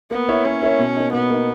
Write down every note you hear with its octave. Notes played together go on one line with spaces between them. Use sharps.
A#3 B3
E4 A#4 C#5 E5
A#3 C#4
E4 A#4 C#5 E5
B2
A#3 D#4
B2 B3
A#3 D#4